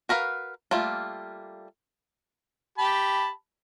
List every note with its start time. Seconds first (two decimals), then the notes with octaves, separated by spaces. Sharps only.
0.09 F#4 A#4 B4 F5
0.71 G3 A3 A#3 F4
2.78 G4 A5 B5